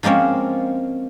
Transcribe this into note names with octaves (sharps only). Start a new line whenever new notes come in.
F3 G#3 A#3 C4 C#4